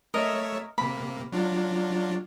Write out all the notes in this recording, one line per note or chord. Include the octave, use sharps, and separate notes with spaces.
A3 A#4 C#5 D#5 E5
C3 A#3 B5
F#3 D4 F4